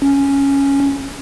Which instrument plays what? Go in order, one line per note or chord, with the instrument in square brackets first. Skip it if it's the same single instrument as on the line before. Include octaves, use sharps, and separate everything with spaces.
[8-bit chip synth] C#4